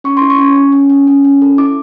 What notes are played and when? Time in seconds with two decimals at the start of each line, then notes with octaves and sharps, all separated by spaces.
0.04 C#4 C#6
0.17 E4 C6
0.30 C#6
0.39 C#4
0.55 C#4
0.72 C#4
0.90 C#4
1.07 C#4
1.24 C#4
1.42 A4
1.58 E4 D6